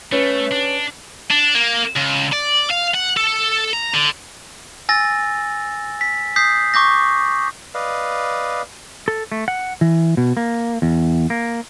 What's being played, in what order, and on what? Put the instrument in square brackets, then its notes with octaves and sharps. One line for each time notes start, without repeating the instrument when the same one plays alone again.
[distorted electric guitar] A3 [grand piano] C#4 B4
[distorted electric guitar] D4
D4
A#3
C#2
D5
F5
F#5
A4
A#5
D3
[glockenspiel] G#5 E6 A6 A#6
B6
D#6 G6 B6 C7
C#6 D6 G6 A#6
[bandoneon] B4 D5 D#5 F5
[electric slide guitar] A4
A3
F#5
E3
B2
A#3
E2
A#3